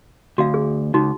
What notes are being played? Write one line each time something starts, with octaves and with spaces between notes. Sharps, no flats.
D2 F#4 F5
G#4
C#2 D#4 F#4